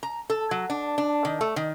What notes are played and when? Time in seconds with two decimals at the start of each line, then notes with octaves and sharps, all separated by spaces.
0.03 A#5
0.30 A4
0.51 F#3
0.70 D4
0.98 D4
1.25 D#3
1.41 A3
1.56 D#3